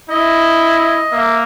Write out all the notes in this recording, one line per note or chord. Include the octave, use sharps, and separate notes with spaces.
E4 D#5
A#3 E5